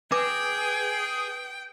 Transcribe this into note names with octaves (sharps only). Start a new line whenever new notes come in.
G#4 B4 G5 D6